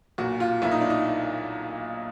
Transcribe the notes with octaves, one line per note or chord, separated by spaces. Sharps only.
B1 A#2 F#4
F4
B1 A#2 E4
D#4
D4
D#4